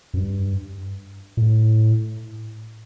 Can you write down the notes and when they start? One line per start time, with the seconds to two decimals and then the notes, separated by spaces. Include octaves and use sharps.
0.14 F#2
0.17 G2
1.37 A2